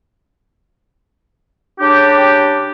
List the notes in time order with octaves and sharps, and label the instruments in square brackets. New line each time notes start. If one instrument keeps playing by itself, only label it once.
[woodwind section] C#3 D4 G4